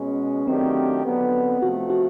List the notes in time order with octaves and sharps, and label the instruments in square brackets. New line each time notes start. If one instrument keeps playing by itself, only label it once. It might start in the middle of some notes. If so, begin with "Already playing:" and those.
Already playing: [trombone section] B2 G#3 C#4
[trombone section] D#3 F#3 A3 D4 G4 [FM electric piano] C4
[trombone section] D3 F#3 B3
[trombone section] C3 F3 A3 [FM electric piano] F#4
[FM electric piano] F#4